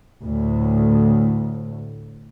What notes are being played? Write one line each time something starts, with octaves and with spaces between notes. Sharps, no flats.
D2 A2